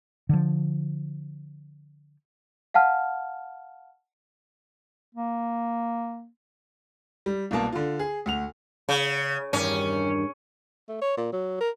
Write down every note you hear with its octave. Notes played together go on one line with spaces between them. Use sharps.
D3 F3
F5 F#5 A5 F6
A#3
G3
C2 B2 A#3 A5
D3 F4
G#4
D2 F#5 F7
C#3
E2 G2 D#3 C#4
A3
C#5
A#2
F#3
A#4